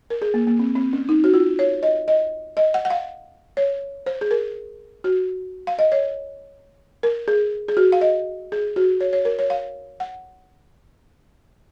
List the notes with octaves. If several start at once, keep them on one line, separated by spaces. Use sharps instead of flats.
A#4
G#4
A#3
A#3
C4
C4
C#4
D#4
F#4
F4
C#5
D#5
D#5
D#5
F#5
F#5
F5
C#5
C5
G#4
A#4
F#4
F5
D#5
C#5
A#4
G#4
G#4
F#4
F5
D#5
G#4
F#4
C#5
C#5
A#4
C#5
F5
F#5